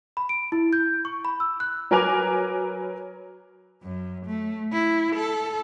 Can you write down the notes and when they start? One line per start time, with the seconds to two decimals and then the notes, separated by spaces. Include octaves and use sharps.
0.17 B5
0.29 D7
0.52 E4
0.73 G6
1.05 C#6
1.25 B5
1.40 E6
1.60 F#6
1.91 F#3 A#4 B4 G#5 D6 F7
3.83 F#2
4.26 A3
4.73 E4
5.16 A4